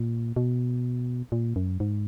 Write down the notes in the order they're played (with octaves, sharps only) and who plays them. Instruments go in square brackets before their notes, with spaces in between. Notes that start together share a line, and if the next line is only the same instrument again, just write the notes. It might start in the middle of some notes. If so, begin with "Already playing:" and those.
Already playing: [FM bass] A#2
B2
A#2
F#2
G#2